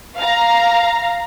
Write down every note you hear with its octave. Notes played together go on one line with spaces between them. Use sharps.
F5 A#5